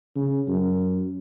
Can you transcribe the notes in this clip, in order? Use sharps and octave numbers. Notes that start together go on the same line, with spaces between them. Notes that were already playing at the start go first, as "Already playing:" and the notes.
C#3
F#2